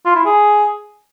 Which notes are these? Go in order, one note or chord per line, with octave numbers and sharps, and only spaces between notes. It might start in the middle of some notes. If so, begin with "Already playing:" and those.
F4
E4
G#4